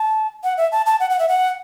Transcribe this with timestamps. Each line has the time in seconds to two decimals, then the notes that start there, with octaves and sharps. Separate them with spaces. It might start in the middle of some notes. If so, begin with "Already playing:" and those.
Already playing: A5
0.44 F#5
0.58 E5
0.72 A5
0.86 A5
1.00 F#5
1.10 F#5
1.19 E5
1.29 F#5